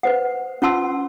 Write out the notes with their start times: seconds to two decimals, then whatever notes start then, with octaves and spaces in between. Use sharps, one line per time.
0.03 B4 C5 F#5
0.62 C#4 F4 F#5 A5 C6 E6